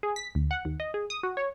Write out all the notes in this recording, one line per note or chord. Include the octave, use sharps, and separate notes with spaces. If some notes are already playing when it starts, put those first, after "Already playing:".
G#4
B6
D2
F#5
D#2
D#5
G#4
D#6
F#4
C#5